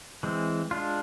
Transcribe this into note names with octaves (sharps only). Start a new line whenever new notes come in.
E3 G#3 C4
G#3 D4 F4